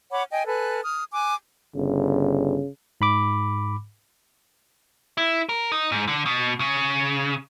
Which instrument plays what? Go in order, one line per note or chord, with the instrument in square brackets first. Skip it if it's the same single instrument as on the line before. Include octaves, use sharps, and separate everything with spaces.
[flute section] C#5 F#5 B5 D6
D#5 G5 G#5
A4 B4 G#5 F#6
D#6 F6
G#5 D6 F#6
[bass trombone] G1 [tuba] C#3
[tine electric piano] G#2 B5 D6
[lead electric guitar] E4
A#4
D#4
G#2
D3
B2
C#3